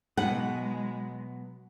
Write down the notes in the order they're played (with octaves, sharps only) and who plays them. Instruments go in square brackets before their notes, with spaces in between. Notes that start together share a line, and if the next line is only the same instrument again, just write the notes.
[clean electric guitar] B2 F#3 B3 [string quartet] G#3 [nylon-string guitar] F#5